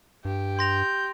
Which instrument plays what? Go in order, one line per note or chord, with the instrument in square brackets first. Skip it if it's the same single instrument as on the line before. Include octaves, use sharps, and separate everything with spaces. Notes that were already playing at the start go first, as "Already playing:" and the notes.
[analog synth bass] G2 [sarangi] G4
[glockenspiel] C6 A#6 F7 [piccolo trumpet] G6